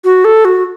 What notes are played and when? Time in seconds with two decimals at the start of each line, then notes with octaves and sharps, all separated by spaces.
0.04 F#4
0.25 A4
0.45 F#4